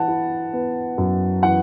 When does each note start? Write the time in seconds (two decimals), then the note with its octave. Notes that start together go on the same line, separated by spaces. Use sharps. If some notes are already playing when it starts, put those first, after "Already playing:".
Already playing: E3 F#5 A5
0.08 E4
0.53 B3
0.98 F#2
1.43 E3 F#5